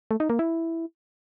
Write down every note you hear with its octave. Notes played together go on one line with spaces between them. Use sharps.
A3
D#4
A#3
E4